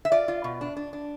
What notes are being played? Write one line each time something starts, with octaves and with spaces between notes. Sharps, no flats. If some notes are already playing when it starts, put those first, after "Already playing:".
E5
F4 D5
F4
B2
D4
D4
D4